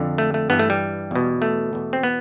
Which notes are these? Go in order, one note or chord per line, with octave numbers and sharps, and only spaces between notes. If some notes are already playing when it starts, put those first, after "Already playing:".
Already playing: F2 D3
A3
A3
G2 E3 B3
A3
G3
E2 B2
A3
E2 B2
C4
B3